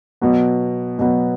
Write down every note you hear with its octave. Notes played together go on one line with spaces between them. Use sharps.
B2 F#3 B3
B2 F#3 B3